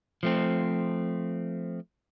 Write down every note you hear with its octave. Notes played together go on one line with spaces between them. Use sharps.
F3 A3 C4